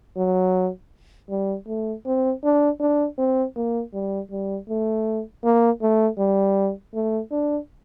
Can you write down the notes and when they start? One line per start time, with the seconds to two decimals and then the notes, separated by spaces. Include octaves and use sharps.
0.17 F#3
1.30 G3
1.67 A3
2.06 C4
2.44 D4
2.80 D4
3.18 C4
3.56 A#3
3.94 G3
4.31 G3
4.69 A3
5.44 A#3
5.82 A3
6.19 G3
6.94 A3
7.31 D4